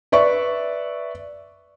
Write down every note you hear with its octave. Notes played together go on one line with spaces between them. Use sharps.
B4 D5 E5 C#6